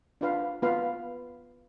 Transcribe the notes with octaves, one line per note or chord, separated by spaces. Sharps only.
D4 F4 B4 F5
B3 F4 B4 F5